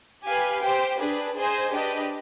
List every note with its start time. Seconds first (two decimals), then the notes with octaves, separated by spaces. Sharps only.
0.26 G4 B4 F5 G#5
0.63 G4 C5 G5
0.99 D4 G#4 B4
1.36 G#4 C5 D#5 G#5
1.72 D4 G4 B4 D#5